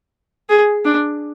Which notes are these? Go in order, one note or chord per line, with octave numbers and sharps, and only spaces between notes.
G#4
D4